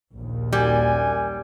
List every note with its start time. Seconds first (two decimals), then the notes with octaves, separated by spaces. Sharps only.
0.14 A#1 D#2
0.53 F#2 G3 F#5 G#5